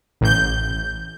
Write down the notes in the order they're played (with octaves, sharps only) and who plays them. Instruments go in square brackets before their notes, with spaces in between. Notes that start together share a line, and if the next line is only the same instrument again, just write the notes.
[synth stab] A1 G6